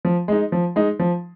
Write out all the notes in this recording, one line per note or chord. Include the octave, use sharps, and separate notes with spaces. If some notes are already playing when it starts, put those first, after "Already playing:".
F3
G#3 D#4
F3
G#3 D#4
F3